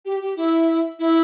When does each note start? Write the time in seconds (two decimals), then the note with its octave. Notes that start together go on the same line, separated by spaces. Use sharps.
0.05 G4
0.21 G4
0.36 E4
0.99 E4